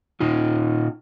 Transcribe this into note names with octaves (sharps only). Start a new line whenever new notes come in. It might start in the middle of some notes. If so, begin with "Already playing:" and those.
A#2 D#4 F4